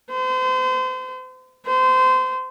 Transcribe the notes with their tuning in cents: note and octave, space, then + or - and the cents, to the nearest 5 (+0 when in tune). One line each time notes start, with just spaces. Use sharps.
C5 -35
C5 -25